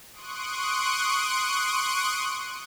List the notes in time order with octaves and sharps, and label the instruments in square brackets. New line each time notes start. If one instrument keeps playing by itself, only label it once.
[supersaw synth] C6 C#6 D#6 F#6 D7